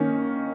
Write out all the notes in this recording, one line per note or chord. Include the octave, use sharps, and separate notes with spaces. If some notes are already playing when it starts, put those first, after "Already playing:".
Already playing: D#3 A#3 C#4